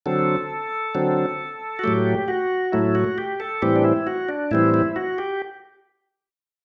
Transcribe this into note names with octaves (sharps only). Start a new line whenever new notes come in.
D3 F#3 C4 A4
D3 F#3 C4
F#4
A2 F#3 A3 G4
F#4
A2 F#3 A3 E4
F#4
G4
A4
A2 E3 G3 C4 G4
D4
E4
F#4
D4
A2 E3 G3 C4 E4
E4
F#4
G4